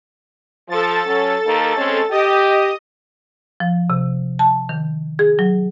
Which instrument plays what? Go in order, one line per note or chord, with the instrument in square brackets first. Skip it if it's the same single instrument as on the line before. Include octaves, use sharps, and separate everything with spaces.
[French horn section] F3 [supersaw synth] A4 A6
[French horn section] F#3 C#4
D#2 D#3 A#3
G#3 C4 C#4
[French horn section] G4 [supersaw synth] D#5 D#6
[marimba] F3
C3
A5
D#3
G#4
F#3